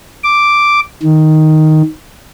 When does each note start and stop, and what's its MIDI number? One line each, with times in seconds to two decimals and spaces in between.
0.24 0.80 86
1.03 1.82 51